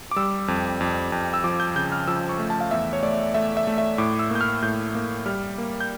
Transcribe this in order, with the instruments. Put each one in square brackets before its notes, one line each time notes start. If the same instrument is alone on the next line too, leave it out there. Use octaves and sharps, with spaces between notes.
[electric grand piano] D6
G3 E6
F2
F2
F2
E6
F3 D6
G6
C#3 G6
F6
F3 E6
C#6
A3
A5
F5
E2 E5
C#5
A3 D5
A3 E5
E5
A3
E5
A2 D6
E6
A#3 G6
F6
A2 G6
A#3
G3 F6
A#3
G6